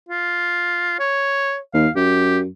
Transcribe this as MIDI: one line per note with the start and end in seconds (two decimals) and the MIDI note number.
0.09 0.95 65
0.99 1.57 73
1.74 1.87 39
1.74 1.90 77
1.96 2.47 42
1.96 2.37 67